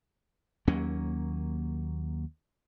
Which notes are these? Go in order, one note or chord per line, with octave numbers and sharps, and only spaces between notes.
D#2 F#3 A#3 C#4